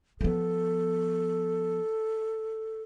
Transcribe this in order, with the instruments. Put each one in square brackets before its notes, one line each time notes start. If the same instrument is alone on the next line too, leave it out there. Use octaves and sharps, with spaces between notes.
[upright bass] F3 B3 [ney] A4